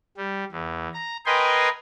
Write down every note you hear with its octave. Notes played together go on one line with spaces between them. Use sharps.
G3
E2
A#5
A#4 B4 D#5 G5 G#5 C6